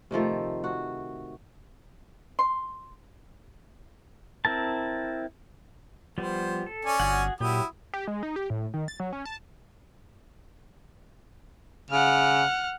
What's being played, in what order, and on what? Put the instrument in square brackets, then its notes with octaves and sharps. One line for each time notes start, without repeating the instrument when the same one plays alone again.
[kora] C3 D#3 F3 A3
F#4
[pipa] C6
[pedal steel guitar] C4 E4 A#4 A5
[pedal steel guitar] F3 G3 B3 [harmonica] C5
[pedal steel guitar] A4
[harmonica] C#4 D5 G#5
[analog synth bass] G1 [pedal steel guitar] F#4 G#4 F#5
[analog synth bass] A#2 [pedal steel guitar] F#3 G4 [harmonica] E4 F#4 D#6
[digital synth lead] G4
G#3
D#4
G4
A2
D#3
A6
F#3
C#4
A5
[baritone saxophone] C#3 [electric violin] F#5 F6